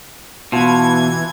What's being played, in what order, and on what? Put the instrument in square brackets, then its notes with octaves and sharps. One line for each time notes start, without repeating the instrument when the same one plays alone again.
[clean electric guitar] B2 [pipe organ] E3 G#6 [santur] E4 F4 A5